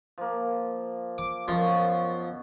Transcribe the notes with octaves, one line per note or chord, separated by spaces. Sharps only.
F3 A#3
D6
F#2 B2 F3 C#6